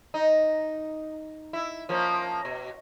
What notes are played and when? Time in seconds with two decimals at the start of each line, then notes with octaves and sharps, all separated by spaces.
0.14 D#4
1.53 E4
1.89 F3 A#3 C#4
2.45 B2